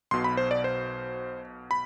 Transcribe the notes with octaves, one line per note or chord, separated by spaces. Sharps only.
B1 B2 C6
B5
C5
D5
C5
B5